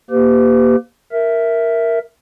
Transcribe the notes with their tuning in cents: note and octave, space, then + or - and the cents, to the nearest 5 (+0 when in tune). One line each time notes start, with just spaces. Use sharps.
A#3 +10 G4 +0 B4 +45
A#4 +0 E5 +0